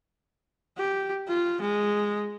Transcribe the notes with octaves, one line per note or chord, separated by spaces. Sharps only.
G4
F4
G#3